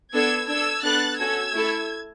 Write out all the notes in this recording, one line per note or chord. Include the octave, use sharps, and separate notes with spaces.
B3 D4 A4 E6 G#6
D4 A4 E6 G#6
B3 D4 A4 F#6 A6
C#4 F#4 A4 E6 G#6
A3 E4 A4